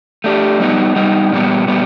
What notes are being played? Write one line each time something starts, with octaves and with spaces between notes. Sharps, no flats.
A3 D4 G4
G3 B3 D#4
G3 B3 D#4
A#2 G3 B3
A#2 G3 B3